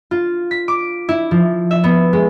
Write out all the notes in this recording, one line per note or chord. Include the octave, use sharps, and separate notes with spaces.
F4
B6
D6
E4
F3
E5
B3
G#3